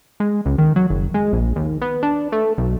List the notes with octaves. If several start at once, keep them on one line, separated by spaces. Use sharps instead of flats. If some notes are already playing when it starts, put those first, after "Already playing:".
G#3
C#2
D#3
F#3
F#1
G#3
A#1
D#2
B3
D4
A3
B1